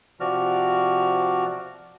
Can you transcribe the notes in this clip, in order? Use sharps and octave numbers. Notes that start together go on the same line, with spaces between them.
C3 F3 F#4 D5 F6